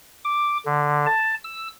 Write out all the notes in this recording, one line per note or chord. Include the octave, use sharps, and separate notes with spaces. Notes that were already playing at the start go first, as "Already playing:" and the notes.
D6
D3
A5
E6